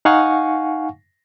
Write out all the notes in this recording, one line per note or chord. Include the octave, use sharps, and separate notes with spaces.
D#4 F5 F#5 G#5 C#6